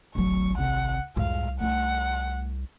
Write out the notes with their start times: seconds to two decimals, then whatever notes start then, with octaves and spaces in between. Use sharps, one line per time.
0.15 D1 G#1 F#3 C#6
0.58 C2 F#5
1.16 C2 F2 G#2 F5
1.60 A3 D#4 F#5